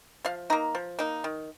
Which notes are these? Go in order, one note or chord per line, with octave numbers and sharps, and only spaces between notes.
F3 F5
A#3 D#4 A#5
F3
A#3 D#4
D#3